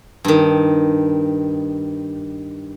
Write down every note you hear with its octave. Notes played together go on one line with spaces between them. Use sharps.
G2 D#3